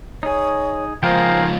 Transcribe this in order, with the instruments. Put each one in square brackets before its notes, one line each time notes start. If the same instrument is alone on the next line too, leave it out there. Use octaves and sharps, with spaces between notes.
[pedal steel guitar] D#4 G#4 [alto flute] C#5
[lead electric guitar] C#2 F3 [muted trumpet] A#3 [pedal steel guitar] G#4 F5 G5 [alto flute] C5